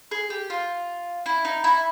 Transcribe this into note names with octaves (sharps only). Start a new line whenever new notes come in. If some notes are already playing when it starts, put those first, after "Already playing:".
G#4
G4
F4
E4
D#4
E4